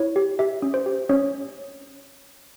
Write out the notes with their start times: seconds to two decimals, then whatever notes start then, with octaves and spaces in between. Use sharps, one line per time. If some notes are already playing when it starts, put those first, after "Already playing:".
Already playing: E4 C#5
0.16 G4
0.39 G4 E5
0.62 C#4
0.74 C5
0.86 G4
1.09 C#4 C#5